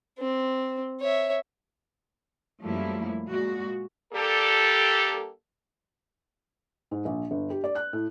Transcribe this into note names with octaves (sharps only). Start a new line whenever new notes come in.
C4
C#5 E5
F#2 F3 G3 A3 A#3 E4
A#2 G#3 F#4
G3 A#3 D4 G4 A4
G#2
A#1
G1
G4
D5
F#6
A2